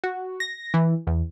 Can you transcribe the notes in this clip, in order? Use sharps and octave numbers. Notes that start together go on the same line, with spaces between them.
F#4
A#6
E3
E2